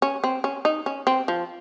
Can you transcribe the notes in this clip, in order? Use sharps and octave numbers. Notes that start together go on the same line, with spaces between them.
C#4
C4
C#4
D#4
C#4
C4
F3